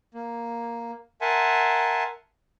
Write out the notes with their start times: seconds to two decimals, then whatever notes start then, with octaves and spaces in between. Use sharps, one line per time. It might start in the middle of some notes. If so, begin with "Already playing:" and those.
0.14 A#3
1.21 A#4 E5 F#5 G#5 A5 C6